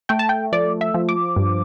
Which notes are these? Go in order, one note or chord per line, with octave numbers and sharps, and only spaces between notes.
A3 G5
A5
G5
F3 D5
E5
F3
D6
G2